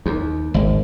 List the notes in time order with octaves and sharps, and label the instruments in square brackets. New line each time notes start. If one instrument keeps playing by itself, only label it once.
[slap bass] D#2
G#1